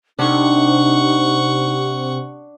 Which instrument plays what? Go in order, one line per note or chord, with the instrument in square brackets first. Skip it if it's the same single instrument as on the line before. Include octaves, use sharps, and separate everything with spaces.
[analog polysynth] C3 [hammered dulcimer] D4 [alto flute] D#4 [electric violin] F#5 C#6